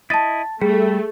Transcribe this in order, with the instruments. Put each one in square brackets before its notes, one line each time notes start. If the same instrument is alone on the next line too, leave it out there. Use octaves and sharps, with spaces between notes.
[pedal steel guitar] E4 D#5 [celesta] A5 A6
[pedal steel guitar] G3 [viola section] A3 [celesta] G#4